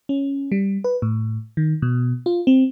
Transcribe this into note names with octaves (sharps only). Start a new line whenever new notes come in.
C#4
G3
B4
A2
D#3
B2
F4
C4